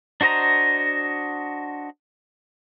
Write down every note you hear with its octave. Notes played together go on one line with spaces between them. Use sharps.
D4 F#4 C5 D#5 A#5